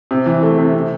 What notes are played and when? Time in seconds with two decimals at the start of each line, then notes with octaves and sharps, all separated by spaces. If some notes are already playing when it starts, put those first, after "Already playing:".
0.11 C3
0.26 E3
0.43 A3
0.58 C3
0.74 C3